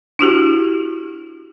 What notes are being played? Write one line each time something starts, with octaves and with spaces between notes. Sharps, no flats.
D4 E4 F#4 G4